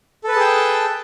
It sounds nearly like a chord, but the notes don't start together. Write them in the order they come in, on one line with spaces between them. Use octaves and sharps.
A4 B4 A5 G#4 G5